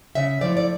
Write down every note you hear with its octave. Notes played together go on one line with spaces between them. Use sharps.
C#3 E5
F3 A3 E4 D5
D5